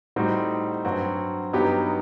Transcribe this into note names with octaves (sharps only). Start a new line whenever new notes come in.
A2 G3 C4 D#4 F#4
G2 F#3 C4 F#4
G2 F#3 B3 D#4 G4